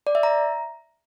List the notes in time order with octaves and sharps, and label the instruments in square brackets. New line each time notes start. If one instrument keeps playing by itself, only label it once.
[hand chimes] D5
E5
A#5